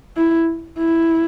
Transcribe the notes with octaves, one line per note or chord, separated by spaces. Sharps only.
E4
E4